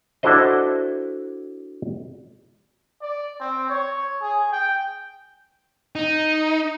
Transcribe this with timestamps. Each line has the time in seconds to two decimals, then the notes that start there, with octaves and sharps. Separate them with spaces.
0.23 D4 E4 F#4 A4 C5 D#5
3.02 D5
3.40 C4
3.69 C#5
4.21 G#4
4.52 G5
5.96 D#4